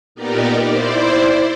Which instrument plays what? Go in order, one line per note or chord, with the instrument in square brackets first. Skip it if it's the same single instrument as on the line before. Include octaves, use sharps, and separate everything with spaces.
[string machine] A#2 B3 D#4 G4 A#4 D5
E4 C5 D5